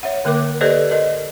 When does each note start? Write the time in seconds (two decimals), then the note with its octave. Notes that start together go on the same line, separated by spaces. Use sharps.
0.03 C#5 E5 F#5
0.25 D3 A#3 A#4 D6
0.61 G4 A4 B4 C5 D5 D#5
0.91 A#4 D#5